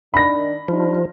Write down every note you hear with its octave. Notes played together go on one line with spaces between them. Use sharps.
D#3 D4 B5 A#6
F3 G3 D4 D#4